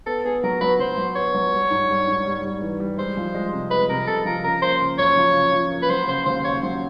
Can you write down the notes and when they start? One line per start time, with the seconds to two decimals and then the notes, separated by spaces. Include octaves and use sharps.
0.06 B3 A4
0.25 B3 G#4
0.43 F#3 A#4
0.61 F#3 B4
0.80 F#3 C5
0.97 F#3
1.16 B3 C#5
1.34 F#3
1.53 G3
1.71 G#2
1.89 G3
2.07 G#2
2.26 G3
2.44 G3
2.62 E3
2.80 G3
2.98 G#3 C5
3.17 F3
3.34 G#3
3.53 C3
3.71 G#3 B4
3.89 C3 A#4
4.07 C3 A4
4.25 F3 A#4
4.44 C#3 A#4
4.62 A#3 C5
4.81 C#3
4.98 F#2 C#5
5.17 F3
5.35 C#3
5.53 F3
5.71 A#3
5.82 B4
5.89 F#3 C5
6.07 C#3 C5
6.26 D#2 C5
6.44 C#3 C#5
6.63 F#3 C5